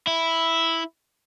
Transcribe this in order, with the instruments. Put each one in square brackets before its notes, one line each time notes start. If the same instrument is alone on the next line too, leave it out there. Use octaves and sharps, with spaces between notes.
[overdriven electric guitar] E4